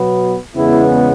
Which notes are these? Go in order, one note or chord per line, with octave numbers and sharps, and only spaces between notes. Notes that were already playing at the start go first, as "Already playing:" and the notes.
Already playing: B2 F#3 B3
E2 C#3 G#3 B3 E4